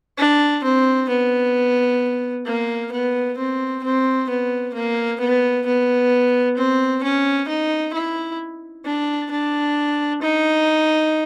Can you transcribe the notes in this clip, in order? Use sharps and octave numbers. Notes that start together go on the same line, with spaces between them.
D4
C4
B3
A#3
B3
C4
C4
B3
A#3
B3
B3
C4
C#4
D#4
E4
D4
D4
D#4